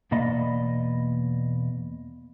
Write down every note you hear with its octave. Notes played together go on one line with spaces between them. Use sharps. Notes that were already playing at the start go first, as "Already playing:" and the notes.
E2 B2 A#3 D5 D#5 B5